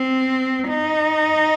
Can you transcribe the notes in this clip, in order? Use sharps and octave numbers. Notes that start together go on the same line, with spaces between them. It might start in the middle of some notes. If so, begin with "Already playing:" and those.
Already playing: C4
D#4